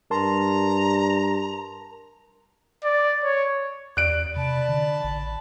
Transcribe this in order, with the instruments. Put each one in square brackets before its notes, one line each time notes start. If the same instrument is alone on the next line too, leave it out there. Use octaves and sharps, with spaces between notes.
[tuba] G2 [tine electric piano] A#4 A5 C6 [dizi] A#5
[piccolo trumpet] D5
C#5
[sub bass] E2 [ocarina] D5 [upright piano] F#6 D7
[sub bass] C3 [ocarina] D5 [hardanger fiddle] A5 B5
[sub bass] D3
A1